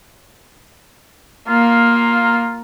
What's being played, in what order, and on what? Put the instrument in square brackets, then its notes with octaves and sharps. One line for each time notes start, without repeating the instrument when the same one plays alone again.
[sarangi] A#3 [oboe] F4